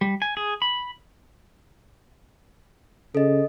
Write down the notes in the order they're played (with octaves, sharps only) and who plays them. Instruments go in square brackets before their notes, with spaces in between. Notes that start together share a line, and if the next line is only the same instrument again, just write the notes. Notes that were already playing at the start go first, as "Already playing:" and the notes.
[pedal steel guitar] G3
G#5
G#4
B5
[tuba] C#3 [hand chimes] A4 D#5